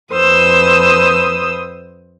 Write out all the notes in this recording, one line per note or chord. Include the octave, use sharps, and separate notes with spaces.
F2 B4 C5 D#6 E6